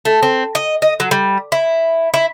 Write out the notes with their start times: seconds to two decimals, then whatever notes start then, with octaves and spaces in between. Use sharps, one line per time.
0.05 A3
0.23 C4
0.55 D#5
0.82 D#5
1.00 F#3
1.11 G3
1.52 E4
2.14 E4